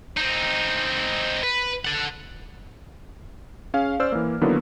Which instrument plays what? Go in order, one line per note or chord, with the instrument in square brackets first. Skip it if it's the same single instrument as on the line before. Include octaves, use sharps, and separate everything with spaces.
[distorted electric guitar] C4 D#4
B4
A4 F#5
[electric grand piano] C#4 G#4 F5
C#4 C5 D5 E6 F6
E3 A#3
D3 D#3 F#3 A#3 B3 E4